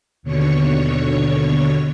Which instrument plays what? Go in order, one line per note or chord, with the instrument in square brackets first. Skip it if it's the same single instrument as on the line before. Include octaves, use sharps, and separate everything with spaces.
[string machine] D#2 B2 D3 C#5 C#6